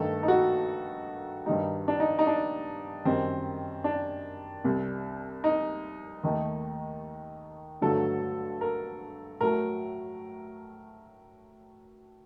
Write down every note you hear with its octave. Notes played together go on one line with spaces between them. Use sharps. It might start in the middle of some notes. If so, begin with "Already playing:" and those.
Already playing: G2 D#3 A3 A4
D#4
F#4
G2 D#3 G3 D#4
D4
D#4
D#4
D4
F#2 D#3 G3 C4
D4
C2 C3 G3
D#4
D#2 D#3 A3
G2 D3 F#3 A3 A4
A#4
A2 F#3 A3 A#4